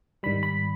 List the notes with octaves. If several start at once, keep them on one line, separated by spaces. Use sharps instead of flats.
G#2 D#3 G3 B5
B5